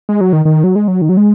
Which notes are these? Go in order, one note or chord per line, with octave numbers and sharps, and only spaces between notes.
G#3
F#3
D#3
D#3
F#3
G#3
F#3
D#3
F#3
G#3